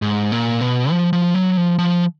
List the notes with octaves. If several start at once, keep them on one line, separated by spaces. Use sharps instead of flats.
G#2
A#2
B2
F3
F3
F#3
F3
F3